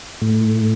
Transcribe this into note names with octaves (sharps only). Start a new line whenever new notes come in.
A2